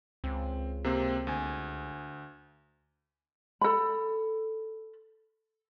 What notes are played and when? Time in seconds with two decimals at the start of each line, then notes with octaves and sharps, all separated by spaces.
0.24 C#2 C4
0.84 C3 A#3 C4
1.27 D2 G#5
3.61 A4 B5